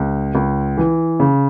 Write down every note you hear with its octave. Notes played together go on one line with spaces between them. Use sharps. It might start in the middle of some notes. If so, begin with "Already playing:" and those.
Already playing: C#2
C#2
E3
C#3